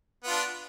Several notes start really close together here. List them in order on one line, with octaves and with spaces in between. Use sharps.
B3 F4 D4